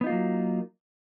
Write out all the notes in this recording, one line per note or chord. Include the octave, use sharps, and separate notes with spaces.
F#3 A#3 B3 D#4 F4